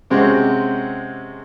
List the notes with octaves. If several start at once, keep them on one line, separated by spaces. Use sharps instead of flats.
C3 G#3 C4 C#4 F#4 G4